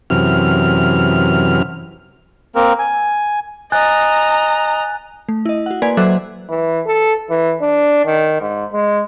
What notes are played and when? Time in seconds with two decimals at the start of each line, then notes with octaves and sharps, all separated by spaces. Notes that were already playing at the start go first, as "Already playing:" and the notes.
0.10 F#2 C3 E3 F6
2.55 A#3 C4 A#4
2.79 G#5
3.72 D#5 G#5 A#5 F#6 A6
5.29 A3
5.45 E4 D#5
5.66 F#4 F#5
5.82 A#3 B4 D5 G#5 C6 G#6
5.97 F#3 A4 C5 E5 D6 F#6
6.49 E3
6.86 A4
7.30 E3
7.62 D4
8.05 D#3
8.41 G#2
8.73 G#3